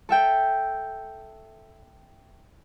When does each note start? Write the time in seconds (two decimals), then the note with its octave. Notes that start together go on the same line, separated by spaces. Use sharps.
0.09 A4 E5 G5